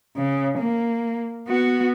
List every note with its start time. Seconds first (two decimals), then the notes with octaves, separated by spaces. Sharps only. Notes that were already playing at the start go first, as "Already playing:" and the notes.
0.17 C#3
0.58 A#3
1.48 B3 F#4